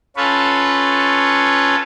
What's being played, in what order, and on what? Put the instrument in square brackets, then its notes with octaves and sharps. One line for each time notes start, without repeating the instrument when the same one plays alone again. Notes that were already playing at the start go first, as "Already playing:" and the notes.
[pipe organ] C#4 F4 A4 B4 C#5